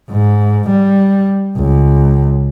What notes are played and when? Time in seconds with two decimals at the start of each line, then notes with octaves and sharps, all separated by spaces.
0.11 G#2
0.69 G3
1.57 C#2